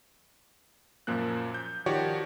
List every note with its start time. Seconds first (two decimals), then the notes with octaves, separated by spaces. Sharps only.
1.07 F#2 A#2 F3 A#3 F#6
1.54 G6
1.86 D#3 F3 F#4 G4 C#5 D5